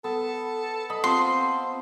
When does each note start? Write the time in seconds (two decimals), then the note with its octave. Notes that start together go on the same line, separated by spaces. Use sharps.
0.04 B3 A4
0.90 D#5 A5 B5
1.04 C4 F4 C6